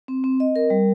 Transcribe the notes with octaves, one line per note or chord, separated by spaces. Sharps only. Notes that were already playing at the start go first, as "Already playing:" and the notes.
C4
C4
D#5
A#4
G3